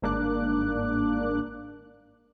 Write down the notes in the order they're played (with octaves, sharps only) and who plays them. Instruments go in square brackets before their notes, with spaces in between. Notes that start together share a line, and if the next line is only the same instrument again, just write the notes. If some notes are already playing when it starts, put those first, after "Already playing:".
[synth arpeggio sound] G1 G#2 A#3 D4 D6 F#6